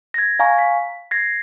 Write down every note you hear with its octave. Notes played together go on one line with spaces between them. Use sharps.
G#6 A#6
F5 G#5 A#5 C#6
B6
G#6 A#6 C7